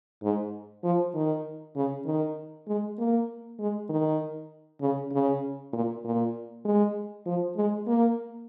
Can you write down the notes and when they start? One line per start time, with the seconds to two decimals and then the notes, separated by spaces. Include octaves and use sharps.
0.23 G#2
0.84 F3
1.15 D#3
1.76 C#3
2.06 D#3
2.67 G#3
2.99 A#3
3.59 G#3
3.89 D#3
4.81 C#3
5.12 C#3
5.73 A#2
6.05 A#2
6.65 G#3
7.26 F3
7.56 G#3
7.87 A#3